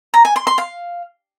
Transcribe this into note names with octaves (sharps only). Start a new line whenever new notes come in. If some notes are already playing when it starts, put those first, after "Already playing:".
A#5
G#5
C6
C6
F5